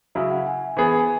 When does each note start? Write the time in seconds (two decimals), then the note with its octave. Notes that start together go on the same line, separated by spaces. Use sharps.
0.15 C#3 F#3 E4 E5
0.30 F#5
0.46 G#5
0.77 E3 B3 G#4
0.99 G#5